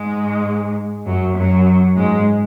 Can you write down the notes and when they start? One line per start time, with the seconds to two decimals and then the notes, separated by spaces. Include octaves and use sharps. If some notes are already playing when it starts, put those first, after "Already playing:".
Already playing: G#2 G#3
1.06 F#2 F#3
1.36 F#2 F#3
1.97 G#2 G#3